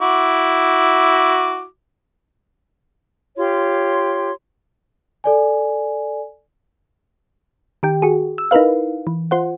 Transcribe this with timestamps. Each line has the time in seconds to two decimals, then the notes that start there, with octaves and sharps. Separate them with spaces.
0.01 E4 F#4 D6
3.37 F4 G4 C#5 C6
5.24 A4 D5 G#5
7.83 D#3 G4 G5
8.02 F#4 G#4
8.38 E6
8.51 D#4 E4 A#4 B4 F5
9.07 E3
9.31 F4 C5 F#5